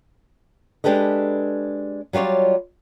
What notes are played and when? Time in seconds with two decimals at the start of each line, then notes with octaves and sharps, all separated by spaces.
0.84 G#3 D4 G4 A4 B4 D#5
2.13 F#3 G3 F4 C#5 D5